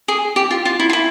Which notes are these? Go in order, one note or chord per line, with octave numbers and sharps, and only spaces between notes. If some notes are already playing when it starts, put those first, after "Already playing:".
G#4
G4
F4
F4
E4
F4
E4